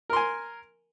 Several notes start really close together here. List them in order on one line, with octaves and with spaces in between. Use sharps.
A#4 C6 G#5